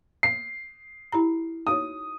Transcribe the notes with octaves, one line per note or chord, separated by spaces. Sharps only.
C7
E4 G4 A#5
D#4 F#4 C#5 D#6